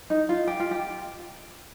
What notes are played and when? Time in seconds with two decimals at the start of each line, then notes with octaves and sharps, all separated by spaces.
0.10 D#4
0.29 F4
0.47 G4
0.60 F4
0.71 G4